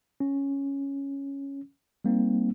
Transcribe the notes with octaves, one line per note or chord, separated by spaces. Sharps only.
C#4
G3 A#3 C4 D#4